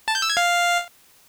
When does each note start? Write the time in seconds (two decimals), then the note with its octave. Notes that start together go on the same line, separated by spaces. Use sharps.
0.08 A5
0.15 G6
0.22 E6
0.30 G#6
0.37 F5